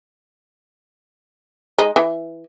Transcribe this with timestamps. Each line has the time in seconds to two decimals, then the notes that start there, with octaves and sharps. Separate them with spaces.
1.78 G#3 D#4
1.96 E3